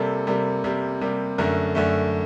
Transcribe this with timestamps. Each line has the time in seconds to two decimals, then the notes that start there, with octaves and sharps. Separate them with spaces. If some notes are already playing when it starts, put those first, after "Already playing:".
Already playing: C3 G3 A#3 A4
0.27 C3 G3 A#3
0.64 C3 G3 A#3
1.01 C3 G3 A#3
1.38 F#2 D3 A3 A#4
1.75 F#2 D3 A3